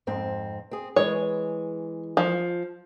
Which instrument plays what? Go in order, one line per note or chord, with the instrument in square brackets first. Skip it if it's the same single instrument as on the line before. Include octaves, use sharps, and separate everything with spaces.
[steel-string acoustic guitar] F2 G#2 C4
C4 G#4
[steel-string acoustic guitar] E3 G#3 [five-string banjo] C#5
[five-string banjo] F3